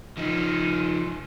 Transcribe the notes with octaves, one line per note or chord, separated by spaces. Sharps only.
F3 D#4